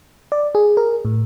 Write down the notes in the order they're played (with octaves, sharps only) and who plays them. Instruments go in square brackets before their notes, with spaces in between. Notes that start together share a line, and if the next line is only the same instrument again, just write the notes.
[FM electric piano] D5
G#4
A#4
A2